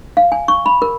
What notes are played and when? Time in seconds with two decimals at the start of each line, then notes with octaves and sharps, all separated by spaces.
0.17 F5
0.32 G#5
0.48 C#6
0.66 B5
0.82 A#4